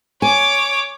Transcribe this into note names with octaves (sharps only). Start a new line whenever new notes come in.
C#5 G#5 D6